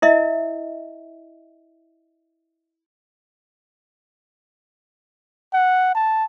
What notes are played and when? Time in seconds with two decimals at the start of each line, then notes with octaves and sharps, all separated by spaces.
0.02 E4 A#4 D#5 E5
5.54 F#5
5.95 A5